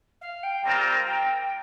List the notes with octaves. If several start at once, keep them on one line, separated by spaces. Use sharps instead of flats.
F5
G5
G3 C4 F4 A#4 A#5
G5